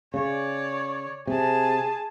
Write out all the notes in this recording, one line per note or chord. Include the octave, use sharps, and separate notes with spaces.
C#3 C#5 D5
C3 G#4 A5